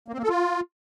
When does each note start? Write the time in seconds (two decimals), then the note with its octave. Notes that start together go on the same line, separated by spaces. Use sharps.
0.08 A#3
0.13 C4
0.18 A#3
0.23 A4
0.29 F4